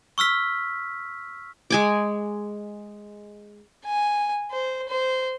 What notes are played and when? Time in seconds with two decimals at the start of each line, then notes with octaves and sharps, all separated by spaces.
0.18 C#6 E6 F6 B6
1.70 G#3 G#5 D6
3.85 G#5
4.51 C5
4.88 C5